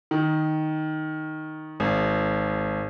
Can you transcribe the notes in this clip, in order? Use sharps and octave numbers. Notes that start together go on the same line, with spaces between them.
D#3
G#1